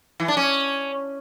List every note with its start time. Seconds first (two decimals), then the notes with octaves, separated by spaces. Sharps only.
0.20 E3
0.28 D4
0.37 C#4